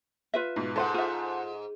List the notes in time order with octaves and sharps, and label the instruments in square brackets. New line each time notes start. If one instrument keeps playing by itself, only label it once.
[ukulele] F4 B4 E5
[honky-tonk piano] G#2 B2
[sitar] G#2 [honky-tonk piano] A4 C5 F#5
[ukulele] F4 E5